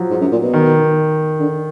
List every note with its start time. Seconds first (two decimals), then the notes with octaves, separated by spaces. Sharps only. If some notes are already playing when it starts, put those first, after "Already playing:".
Already playing: F3 F#3
0.10 G#2
0.21 F#2
0.32 A#2
0.42 B2
0.53 D#3
1.40 D3